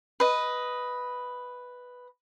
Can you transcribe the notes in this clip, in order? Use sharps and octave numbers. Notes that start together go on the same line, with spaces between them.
B4 D#5